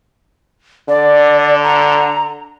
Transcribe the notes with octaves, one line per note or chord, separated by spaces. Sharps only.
D3 D5
A#5